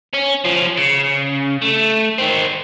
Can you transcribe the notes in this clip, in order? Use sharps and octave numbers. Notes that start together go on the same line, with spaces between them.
C#4
F3 C#4
C#3
A3
D#3 C4